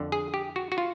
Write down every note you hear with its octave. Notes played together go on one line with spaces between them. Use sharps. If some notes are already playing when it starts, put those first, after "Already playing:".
Already playing: F2 D3
G#4
G4
F#4
F#4
F4